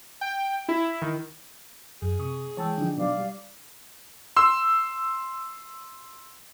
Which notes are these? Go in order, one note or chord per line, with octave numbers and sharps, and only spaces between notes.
G5
E4
D#3
F#2 G#4
C3 C#6 D#6
E3 G#3 C#5 G5 A5 E6
D3 F3 D4 D#4
B2 F#3 D5 F5 D6
G3
C6 E6